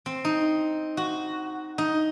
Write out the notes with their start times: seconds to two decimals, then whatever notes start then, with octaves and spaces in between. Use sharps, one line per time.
0.06 C4
0.25 D#4
0.97 F#4
1.78 D#4